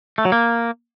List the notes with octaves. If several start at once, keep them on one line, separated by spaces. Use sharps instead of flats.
A3
F#3
A#3